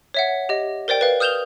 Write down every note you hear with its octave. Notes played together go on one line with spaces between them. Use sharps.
C#5 E5 F#5
G4 D#5
A#4 C5 D5 G5
B4 F5
D#6 F6 G6 E7 F7 G7